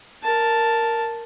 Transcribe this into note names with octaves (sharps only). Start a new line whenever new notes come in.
A#4 A5